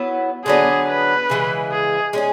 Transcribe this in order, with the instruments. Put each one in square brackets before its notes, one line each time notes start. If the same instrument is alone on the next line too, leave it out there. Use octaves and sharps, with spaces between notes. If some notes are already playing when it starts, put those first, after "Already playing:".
Already playing: [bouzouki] F#3 B3 E4
[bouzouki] D3 F#3 B3 [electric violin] G#4
[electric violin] B4
[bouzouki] C#3 E3 G#3
[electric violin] G#4
[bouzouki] G#3 C#4 G#4